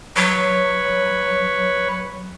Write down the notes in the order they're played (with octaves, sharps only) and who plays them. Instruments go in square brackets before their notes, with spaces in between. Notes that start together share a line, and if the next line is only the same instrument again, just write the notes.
[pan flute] F#3 [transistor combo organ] B4 C#5